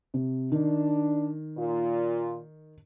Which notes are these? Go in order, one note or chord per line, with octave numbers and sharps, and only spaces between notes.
C3
D#3 D4
A#2 F4